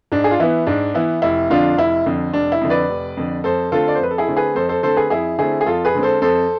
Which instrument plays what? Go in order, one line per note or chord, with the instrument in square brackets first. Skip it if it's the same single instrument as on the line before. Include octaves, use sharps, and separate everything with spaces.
[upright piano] G#2 D4
G#4
F4
E3 B3 E4
G#2 D4
E3 B3 E4
F1 E4
F2 D3 D4 F4
F1 E4
F2 D3
F1 D4
E4
F2 D3
B4 D5
F1
F2 D3
F2 A4 C5
D3 A3 C4 F4 A4
D5
C5
F2 B4
A4
E4 G#4
D3 A3 C4
G#4 B4
F2 A4 C5
A4 C5
D3 A3 C4 A4 C5
G#4 B4
F2 E4 G#4
D3 A3 C4 E4 G#4
G#4
F2 F4 A4
G#4 B4
D3 G#3 C4
A4 C5
F2 A4 C5